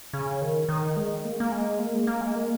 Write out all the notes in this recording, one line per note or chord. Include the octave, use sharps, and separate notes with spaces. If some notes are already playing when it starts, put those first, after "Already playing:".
C#3
D#3
D#3
G#3
A#3
A#3
G#3
A#3
G#3
A#3
G#3
A#3